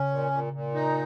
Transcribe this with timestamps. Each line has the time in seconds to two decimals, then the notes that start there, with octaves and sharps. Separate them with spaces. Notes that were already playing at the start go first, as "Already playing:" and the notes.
Already playing: C#3 C#4
0.11 A#2
0.32 A#2
0.53 A#2
0.75 D#4